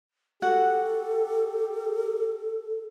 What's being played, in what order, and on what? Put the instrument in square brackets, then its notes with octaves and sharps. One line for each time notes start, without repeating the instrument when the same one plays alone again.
[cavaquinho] F#4 F#5 [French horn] G4 [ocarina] A4